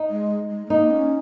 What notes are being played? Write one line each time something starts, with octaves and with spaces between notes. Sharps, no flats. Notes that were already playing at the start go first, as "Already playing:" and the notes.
Already playing: D#4
G#3
G#3
G#3
A#3 D#4
C#4